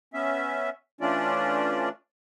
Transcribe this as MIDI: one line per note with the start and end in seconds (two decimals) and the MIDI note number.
0.14 0.70 59
0.14 0.70 61
0.14 0.70 76
1.01 1.89 52
1.01 1.89 57
1.01 1.89 61
1.01 1.89 62
1.01 1.89 65
1.01 1.89 74